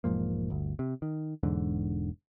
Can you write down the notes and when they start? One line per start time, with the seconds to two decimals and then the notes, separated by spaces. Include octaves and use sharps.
0.04 E1 G#2 F3 A#3
0.50 G1 D2
0.79 C3
1.02 D#3
1.43 E1 E2 G#2 D3